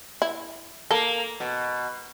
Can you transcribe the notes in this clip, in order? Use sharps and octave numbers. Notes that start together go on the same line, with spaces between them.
E4
A#3 A4
B2